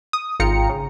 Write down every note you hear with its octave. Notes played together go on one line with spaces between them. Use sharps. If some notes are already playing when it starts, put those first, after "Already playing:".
D#6
G#1 F4 G5 A#5 C#7
C#3